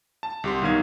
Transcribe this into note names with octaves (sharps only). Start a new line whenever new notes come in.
A5
C2 G4 C6
B1 D#3 F5 G#6